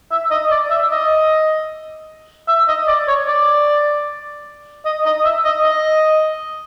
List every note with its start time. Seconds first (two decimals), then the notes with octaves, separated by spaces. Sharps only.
0.12 E5
0.31 D#5
0.51 D5
0.71 E5
0.91 D#5
2.48 E5
2.68 D#5
2.88 D5
3.08 C#5
3.28 D5
4.85 D#5
5.06 D#5
5.25 E5
5.45 D#5
5.65 D#5